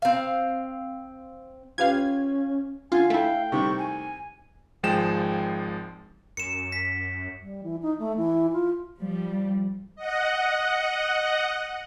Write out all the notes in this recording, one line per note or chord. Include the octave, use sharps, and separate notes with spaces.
C4 F5
C#4 F4 G4 B4 F5 G#6
D3 F4 F5 G#5
A3 E4 G5
C3 D#3 G3 C#6
G#5
G#1 F3 G#3 G5 E7
F#2 C#7 E7
B6
G3
E3
D#4
A3
E3
F4
F3 G3
D#5 F#5